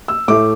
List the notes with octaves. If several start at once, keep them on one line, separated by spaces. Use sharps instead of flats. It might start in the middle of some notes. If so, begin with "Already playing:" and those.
E6
A2 A3 D6